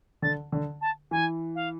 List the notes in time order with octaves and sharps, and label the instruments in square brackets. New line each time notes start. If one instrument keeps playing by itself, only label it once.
[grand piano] D3 [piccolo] A6
[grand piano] D3
[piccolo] A5
[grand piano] E3 [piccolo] G#5
[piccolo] F5